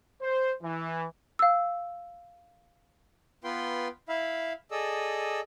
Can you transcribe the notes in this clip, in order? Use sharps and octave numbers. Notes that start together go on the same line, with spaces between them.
C5
E3
F5 E6
B3 F4 B4 G5 C6
E4 E5 F5 B5
G#4 A4 D5 D#5 E6